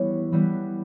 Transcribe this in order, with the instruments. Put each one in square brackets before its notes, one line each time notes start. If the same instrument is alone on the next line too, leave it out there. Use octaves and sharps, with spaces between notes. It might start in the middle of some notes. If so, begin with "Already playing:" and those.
Already playing: [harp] E3 G3 B3 C#5
E3 G3 B3